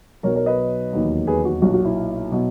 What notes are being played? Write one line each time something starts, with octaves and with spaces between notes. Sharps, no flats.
B1 B2 F#3 A#4 C#5
A#4 C#5
B4 D#5
E1 D#2 D#3 F#3
G#4 B4
F#4
B1 A#2 F#3 F#4
F#4
E4
B2 F#3